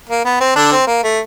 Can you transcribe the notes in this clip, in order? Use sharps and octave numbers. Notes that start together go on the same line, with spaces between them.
A#3
B3
C4
D3 D4
C4
A#3
A3